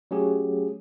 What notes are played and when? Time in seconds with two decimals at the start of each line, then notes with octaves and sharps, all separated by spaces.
0.11 F#3 A3 C#4 G4 G#4